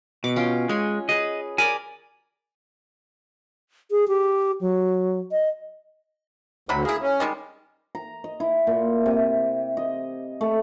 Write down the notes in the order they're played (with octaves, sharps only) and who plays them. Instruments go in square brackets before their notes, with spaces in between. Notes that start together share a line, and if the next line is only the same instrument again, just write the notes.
[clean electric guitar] B2 [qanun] D6
[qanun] C#4 F4 G5
[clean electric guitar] G#3 [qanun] C#5 G#5
[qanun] G#4 B4 [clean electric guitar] D#5
[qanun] A#4 D5 B5 [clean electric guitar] G#5
[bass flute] G#4
G4
F#3
D#5
[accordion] D2 [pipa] C3 F#3 B5
[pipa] A#3 E4 [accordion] G#4
[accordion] C#4
[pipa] D#3 G3 G#3
[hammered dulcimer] A#5
D#5
E4
A#2
C3
D#5
A3